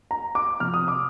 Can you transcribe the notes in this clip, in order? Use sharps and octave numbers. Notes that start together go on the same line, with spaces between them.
A#5
D6
C3 F3 C4 F6
D#6
D6